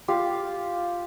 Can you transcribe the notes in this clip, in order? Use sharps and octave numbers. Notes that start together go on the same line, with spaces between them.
F4 G4 F5